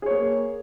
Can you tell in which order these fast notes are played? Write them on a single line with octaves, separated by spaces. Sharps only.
G#4 C#5 A#3